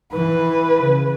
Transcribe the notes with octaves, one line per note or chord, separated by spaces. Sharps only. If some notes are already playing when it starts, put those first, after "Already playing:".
E3 B4
C#3